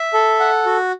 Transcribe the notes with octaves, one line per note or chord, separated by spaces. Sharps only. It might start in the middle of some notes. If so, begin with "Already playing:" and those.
Already playing: E5
A4
F#5
F#4